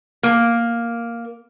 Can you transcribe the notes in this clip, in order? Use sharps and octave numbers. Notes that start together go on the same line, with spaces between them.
A#3